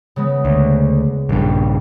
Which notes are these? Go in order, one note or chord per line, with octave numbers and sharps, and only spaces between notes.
C#3 G#3 B3
D2
A#1 G2